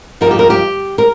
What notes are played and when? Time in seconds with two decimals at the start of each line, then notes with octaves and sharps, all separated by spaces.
0.21 G2 F3 D#4 A#4
0.31 G4
0.39 A#4
0.50 G4
0.98 A#4